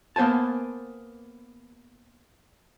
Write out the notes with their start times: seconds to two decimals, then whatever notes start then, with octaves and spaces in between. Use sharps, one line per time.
0.16 A#3 B3 C5 G#5 A5